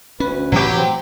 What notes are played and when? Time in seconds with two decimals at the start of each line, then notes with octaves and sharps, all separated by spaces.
0.20 D2 C#4 B4
0.52 A2 E3 F#3 A3 G4
0.76 C4